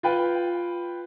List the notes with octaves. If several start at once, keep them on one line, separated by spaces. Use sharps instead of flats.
F4 B4 G5